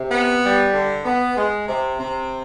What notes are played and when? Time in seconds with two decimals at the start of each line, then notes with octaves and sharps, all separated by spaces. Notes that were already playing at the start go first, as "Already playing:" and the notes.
Already playing: C3
0.11 B3
0.43 G3
0.73 D3
1.05 B3
1.37 G#3
1.67 C3
1.99 C3